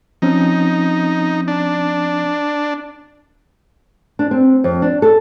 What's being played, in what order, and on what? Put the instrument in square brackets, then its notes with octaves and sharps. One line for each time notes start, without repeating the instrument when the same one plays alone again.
[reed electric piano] F3 C4 C#4 [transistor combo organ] D#4
[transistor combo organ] D4
[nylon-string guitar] D4
C4
F2
D4
A4